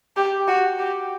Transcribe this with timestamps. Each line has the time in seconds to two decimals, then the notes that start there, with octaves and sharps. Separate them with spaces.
0.17 G4
0.48 F#4
0.79 G4